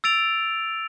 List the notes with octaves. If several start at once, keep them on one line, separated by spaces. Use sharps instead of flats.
E6 A6 D7 F7